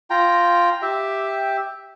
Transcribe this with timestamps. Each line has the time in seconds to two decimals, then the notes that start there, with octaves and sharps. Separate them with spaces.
0.10 F4 G5 A#5
0.82 G4 E5